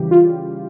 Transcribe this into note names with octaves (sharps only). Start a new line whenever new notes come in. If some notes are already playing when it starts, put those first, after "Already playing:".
Already playing: C#3 E3 G3 G4
F4